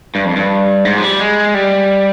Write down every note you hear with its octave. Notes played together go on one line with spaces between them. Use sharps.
G2
F2
G2
G#2
F3
G3
G#3
G3